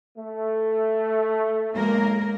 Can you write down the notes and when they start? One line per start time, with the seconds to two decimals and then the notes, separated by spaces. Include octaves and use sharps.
0.18 A3
1.74 B1 G#3 A#3 A#4